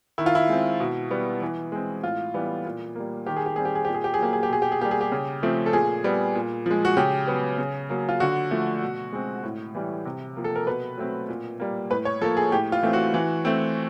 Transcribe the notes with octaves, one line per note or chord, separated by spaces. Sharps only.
D#3 E4
F4
E4
G#3 C4
B2
G3 B3
E3
G#3 C4
A2 F4
E3 G3 B3
A#2
G3 A#3
D#3 G4
G#4
G4
G3 C4 G#4
G4
G#4
A#2 G4
G#4
G4
G#4
F#3 A#3 G4
G#4
G4
B2 G#4
G4
G#4
G3 A#3 G4
G#4
G4
C#3
F3 A3 C4
A4
A#2 G#4
G3 B3
A#2
F3 G#3
F#4
C#3 G4
F#3 B3
C#3
F#3 A#3
F4
D3 F#4
F3 A3
B2
G#3 C4
A2
E3 G3
C3
F3 A#3
A4
A#4
B2 B4
F#3 A3 C4
A#2
G3 A#3
A2 B4
C#5
F3 A#3 A4
G#4
A2 G4
F4
E3 A3 C4
F#4
E3
A3 C4